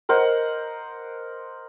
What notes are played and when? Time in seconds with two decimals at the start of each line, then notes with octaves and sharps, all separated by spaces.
0.09 A#4 C5 D#5 F#5